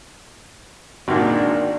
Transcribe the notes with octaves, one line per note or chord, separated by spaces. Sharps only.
G#1 A#2 D#3 D4 F#4